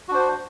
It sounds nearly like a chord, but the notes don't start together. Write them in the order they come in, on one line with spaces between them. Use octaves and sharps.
F#4 D4 C5